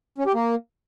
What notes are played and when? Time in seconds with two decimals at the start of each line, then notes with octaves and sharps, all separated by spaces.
0.18 C#4
0.26 G4
0.34 A#3